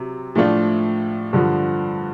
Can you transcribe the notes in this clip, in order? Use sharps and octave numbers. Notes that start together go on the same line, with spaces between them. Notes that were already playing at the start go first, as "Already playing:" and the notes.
Already playing: C3 F#3
A2 F3 A3 D4 F4
G2 D3 F3